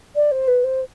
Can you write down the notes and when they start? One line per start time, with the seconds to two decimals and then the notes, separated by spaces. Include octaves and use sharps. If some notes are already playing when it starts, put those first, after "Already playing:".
0.15 D5
0.31 C5
0.47 B4
0.64 C5